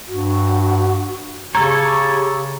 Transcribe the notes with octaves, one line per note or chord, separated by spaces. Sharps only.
G2 F#4
C#3 G4 A4 C#5 A#5